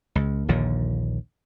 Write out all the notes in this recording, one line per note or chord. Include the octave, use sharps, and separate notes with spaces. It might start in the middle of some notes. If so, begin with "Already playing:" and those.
C#2
A#1 D#2 A#2 D3